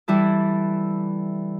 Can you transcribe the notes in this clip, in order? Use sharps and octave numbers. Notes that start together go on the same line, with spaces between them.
E3 G3 E4 A4